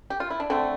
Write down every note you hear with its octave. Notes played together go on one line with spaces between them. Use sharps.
G4
F4
E4
D4
D3 A3 C4